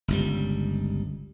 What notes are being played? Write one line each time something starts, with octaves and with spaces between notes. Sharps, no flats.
G1 C#2 G3